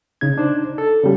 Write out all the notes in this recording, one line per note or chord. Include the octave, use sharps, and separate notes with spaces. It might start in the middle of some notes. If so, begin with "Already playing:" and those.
C#3 D#4 G#6
D4 D#4 C5
A4
C#3 G3